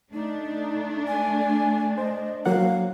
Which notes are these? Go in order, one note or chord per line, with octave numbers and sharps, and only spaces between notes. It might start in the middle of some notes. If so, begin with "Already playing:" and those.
A3 D4 D#4
G#5
C5 D#5
F#3 A#3 F5 F#5